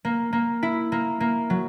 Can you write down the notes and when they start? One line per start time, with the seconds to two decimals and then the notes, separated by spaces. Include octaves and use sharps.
0.05 A#3
0.33 A#3
0.63 E4
0.92 A#3
1.20 A#3
1.50 F#3